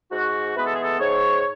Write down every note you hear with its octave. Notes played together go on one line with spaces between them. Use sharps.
G#2 F#4
E3 G#3 B3 B4
A4
G#4
A4
G#2 C#5